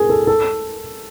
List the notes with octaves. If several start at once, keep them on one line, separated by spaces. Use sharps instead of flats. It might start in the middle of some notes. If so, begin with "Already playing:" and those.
Already playing: G#4 A#4
A4
A4